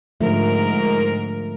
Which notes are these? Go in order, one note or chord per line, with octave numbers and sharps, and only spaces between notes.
G#2 D3 F3 A3 A#4